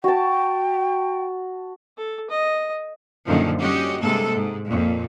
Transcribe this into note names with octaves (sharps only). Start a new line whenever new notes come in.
F#4 G5 A5
A4
D#5
F#2 A#2 D3 D#3 F3
G3 C#4 F#4 G4 D#5
G2 C3 G#3 A#3 A4
G#2
F2 A#2